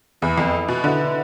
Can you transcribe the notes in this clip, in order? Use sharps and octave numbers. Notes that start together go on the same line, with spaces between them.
E2 E4 B4 E5 B5
F2
B2
D3 E4 B4 E5 B5